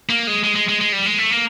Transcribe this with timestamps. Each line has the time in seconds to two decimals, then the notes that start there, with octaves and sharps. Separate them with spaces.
0.09 A#3
0.27 G#3
0.44 G#3
0.55 G#3
0.69 G#3
0.81 G#3
0.93 G3
1.06 G#3
1.18 A3
1.31 A#3